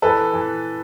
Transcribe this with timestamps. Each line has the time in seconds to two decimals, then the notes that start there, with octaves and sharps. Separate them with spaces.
0.02 E3 A4 B4
0.33 E3